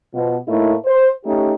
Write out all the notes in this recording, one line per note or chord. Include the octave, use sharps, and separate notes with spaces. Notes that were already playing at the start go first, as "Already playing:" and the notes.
B2 F3 B3
A2 A3 A#3 D#4 E4
C5
A3 C#4 D#4 G4